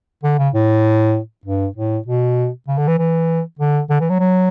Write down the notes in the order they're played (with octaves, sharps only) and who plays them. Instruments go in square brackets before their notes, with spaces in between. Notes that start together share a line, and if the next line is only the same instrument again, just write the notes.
[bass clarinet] D3
C#3
A2
G2
A2
B2
C#3
D3
E3
E3
D3
D3
E3
F#3
F#3